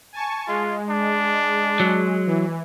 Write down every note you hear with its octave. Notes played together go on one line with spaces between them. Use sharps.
G#5 A5 C#6
G#3 F4
D4
F#3
E3